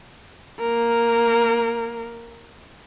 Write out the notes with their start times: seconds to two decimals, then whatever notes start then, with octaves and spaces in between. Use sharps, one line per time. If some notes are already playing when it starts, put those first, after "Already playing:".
0.60 A#3 A#4